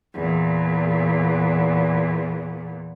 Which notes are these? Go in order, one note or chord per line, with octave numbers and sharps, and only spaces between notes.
E2 A#2